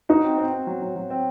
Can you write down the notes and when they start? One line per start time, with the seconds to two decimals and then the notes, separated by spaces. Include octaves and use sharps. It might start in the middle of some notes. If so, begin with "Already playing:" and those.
0.09 D#4 F#4
0.24 C4
0.38 C4
0.53 C4
0.67 F#3
0.82 F#3
0.96 F#3
1.10 C4